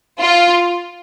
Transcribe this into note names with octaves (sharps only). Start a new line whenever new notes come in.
F4